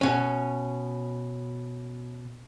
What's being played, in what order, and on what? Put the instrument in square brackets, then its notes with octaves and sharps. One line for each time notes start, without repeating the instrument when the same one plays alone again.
[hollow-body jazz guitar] B2 C#4